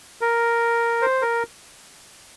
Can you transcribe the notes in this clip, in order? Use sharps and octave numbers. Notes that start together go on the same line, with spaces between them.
A#4
C5
A#4